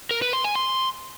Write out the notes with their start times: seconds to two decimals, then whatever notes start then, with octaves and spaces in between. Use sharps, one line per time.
0.11 A#4
0.22 B4
0.33 C6
0.44 G#5
0.56 C6